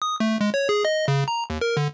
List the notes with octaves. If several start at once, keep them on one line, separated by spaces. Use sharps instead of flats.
D#6
A3
G#3
C#5
G#4
D#5
C#3
A#5
D#2
A#4
D3